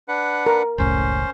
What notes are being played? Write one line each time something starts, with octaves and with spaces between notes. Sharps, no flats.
D4 B4 F#5
A#4
F#1 C#2 A2 C#4 C5